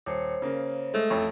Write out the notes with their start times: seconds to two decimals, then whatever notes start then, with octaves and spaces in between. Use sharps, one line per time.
0.06 D#1 C5 C#5
0.42 C#3 A#3
0.94 G#3 A3
1.10 A1 F2 C#5